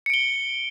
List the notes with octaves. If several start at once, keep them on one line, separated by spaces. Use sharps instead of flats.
C#7 D7 G7